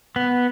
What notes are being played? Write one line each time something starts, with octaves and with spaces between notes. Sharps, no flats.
B3